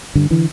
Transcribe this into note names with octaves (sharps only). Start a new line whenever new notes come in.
G2 D3
D3 E3